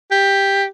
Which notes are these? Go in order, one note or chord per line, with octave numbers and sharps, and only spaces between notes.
G4